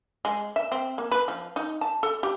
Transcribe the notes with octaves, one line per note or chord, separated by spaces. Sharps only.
G#3
E5
C4
A#3
B4
F3
D#4
A5
A4
G4